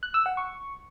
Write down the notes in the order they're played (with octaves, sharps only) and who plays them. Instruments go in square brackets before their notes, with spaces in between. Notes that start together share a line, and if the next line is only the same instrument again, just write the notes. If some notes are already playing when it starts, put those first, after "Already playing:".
[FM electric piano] F#6
E6
F#5
C#6